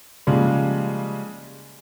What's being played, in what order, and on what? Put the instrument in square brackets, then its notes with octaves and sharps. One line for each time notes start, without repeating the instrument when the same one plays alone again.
[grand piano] C#3 F3 G3 G#3 A#3